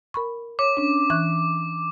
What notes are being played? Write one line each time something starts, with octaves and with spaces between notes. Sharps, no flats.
A#4 B5 C#6
C#5 D6
C#4 D4
E3 C#6 F#6